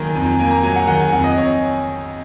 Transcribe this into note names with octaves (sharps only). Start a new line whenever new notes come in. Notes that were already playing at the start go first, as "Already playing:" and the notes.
Already playing: D#3 F#3 A#3 G#5 A#5
F2
A#3 G#5
A#5
F#3 G#5
F#5
D#3 F#5
G#5
F2 F#5
D#5
F2 C#5